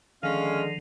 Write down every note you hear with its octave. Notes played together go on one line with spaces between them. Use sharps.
D3 D#3 F3 G#3 C#4 F5